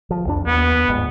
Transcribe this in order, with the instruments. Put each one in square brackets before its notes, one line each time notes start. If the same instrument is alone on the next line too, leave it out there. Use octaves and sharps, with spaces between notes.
[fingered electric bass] F3
C2 F2 D4
[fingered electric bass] D#2 [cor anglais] B3
[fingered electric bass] G1 G#2